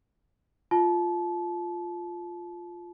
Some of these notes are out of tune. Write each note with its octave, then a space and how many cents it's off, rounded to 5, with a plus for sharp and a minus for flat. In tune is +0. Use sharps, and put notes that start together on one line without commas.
F4 +0 A5 -30